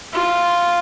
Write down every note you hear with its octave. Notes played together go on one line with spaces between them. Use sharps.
F4